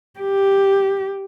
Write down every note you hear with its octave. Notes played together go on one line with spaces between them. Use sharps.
G4